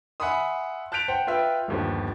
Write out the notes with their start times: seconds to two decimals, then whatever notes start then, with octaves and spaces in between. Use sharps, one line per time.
0.20 E5 F#5 G#5 B5 C6 D#6
0.92 A5 F#6 G6 B6 D7 F7
1.08 C5 F#5 G5
1.27 F4 B4 E5 G5
1.68 G1 D#2 F3